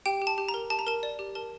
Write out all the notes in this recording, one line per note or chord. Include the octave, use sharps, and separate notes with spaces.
G4 G5
G4
A5
G4
A#5
A#4
G4 A5
A#5
A#4 A5
D5
G4
A#4 A5